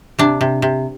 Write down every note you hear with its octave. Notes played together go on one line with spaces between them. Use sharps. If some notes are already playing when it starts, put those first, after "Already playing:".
C3 D4
C3
C3